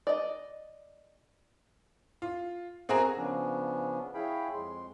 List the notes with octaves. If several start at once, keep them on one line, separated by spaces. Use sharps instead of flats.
D5 D#5
F4
C4 F#4 G#4 A#4 A#5
C#3 F3 B3 C#4 D4
E4 G#4 C#5 F5 G5 B5
F2 G#3 C6